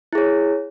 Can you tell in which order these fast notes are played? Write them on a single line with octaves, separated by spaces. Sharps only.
E4 G#4 C#5